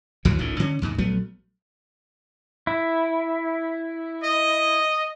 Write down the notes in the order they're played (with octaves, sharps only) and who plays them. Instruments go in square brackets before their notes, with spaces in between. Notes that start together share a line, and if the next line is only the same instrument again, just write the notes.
[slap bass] G#1 D2 E3 F#3
G#1 C#2 A2 D#3
D3 C#4
D#2 G#2 C3
A#1 F#3 A3 B3
[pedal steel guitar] E4
[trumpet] D#5